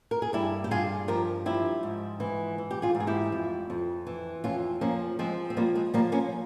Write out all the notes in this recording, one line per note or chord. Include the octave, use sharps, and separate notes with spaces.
A#4
G#4
G2 E4 G4
G4
G2 F4 G#4
F3 G4 A#4
F3 E4 G4
G#2
E3
E3
G4
F4 G#4
G#2
G#4
E4 G4
F2
F2
E3
F2 C#4 F4
F3 A#3 C#4
F3 G#3 C4
C4
F3 G3 A#3
G#3
F3 G3 A#3
A#3 C#4